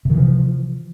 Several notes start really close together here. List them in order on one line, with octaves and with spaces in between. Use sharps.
C3 E3 F3